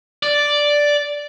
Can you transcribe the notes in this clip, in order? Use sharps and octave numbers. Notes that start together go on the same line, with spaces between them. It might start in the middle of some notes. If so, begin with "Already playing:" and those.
D5